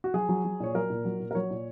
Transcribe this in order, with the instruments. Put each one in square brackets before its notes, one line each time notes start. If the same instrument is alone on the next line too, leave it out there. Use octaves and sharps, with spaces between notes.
[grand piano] F#4
F#3 G#4
F#3
F#3
A#2 C#5
F#3 A#4
A#2
F#3
A#2
A#4
F#3 C#5
A#2